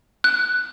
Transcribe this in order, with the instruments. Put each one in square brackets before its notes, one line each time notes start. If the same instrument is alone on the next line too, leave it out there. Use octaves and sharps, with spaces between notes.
[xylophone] F#6